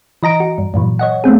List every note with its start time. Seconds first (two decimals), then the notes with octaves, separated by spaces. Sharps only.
0.23 E3 D#5 A#5 D7
0.40 F#4
0.58 G2
0.74 G2 A#2 E3 F#3
0.99 C#5 D#5 F#5
1.24 A3 B3 C4 G#4